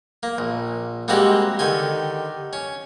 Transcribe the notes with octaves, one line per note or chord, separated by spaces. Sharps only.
A#3
A#1
G3 G#3 A#3 C4 F#4 G4
D3 D#3 G4 G#5
C#4